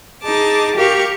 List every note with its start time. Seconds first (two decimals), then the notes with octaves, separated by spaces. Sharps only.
0.22 D#4 G#4 A5 D6
0.75 G4 A#4 F5 C#6